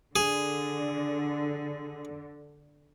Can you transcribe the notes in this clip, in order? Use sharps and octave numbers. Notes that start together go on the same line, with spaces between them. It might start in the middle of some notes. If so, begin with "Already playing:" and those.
D3 G#4